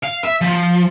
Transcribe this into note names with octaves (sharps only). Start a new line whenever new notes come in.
F5
E5
F3